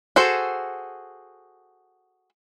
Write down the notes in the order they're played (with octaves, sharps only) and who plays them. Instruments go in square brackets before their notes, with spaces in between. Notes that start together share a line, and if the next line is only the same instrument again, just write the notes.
[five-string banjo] F#4 G#4 A4 C5